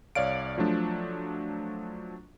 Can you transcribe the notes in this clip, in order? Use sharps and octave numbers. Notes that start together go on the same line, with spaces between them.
C2 C#5 D5 F5 D7
F3 F#3 A3 D4